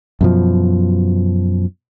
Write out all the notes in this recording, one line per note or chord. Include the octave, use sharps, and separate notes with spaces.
F#2 B2 F3